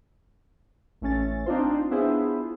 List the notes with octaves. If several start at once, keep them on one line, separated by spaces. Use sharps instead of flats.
A1 A3 C#4 A6
C4 D4 D#4 F4 C5
B3 D4 E4 F4 G#4 C5